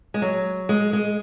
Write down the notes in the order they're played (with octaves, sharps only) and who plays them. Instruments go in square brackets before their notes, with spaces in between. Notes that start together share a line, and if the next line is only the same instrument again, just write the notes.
[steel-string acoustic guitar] G#3
F#3
G#3
G#3